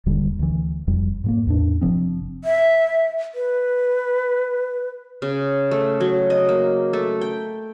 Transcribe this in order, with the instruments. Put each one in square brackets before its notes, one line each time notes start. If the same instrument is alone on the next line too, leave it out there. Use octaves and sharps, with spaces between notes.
[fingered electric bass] D#1 D#2 D3 G3
D2 E3
F1 F2 G3
G#2 G#3 A#3
E2 A2 D4
F#1 C3 F3 C4
[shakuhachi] E5
B4
[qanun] C#3
A3
F#3
D#5
A#3
A3
G5